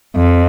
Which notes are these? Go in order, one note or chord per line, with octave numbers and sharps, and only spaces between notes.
F2